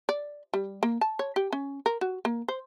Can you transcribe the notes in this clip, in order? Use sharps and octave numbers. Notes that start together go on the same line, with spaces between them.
D5
G3
A#3
A5
C#5
G4
C#4
A#4
F#4
A#3
C5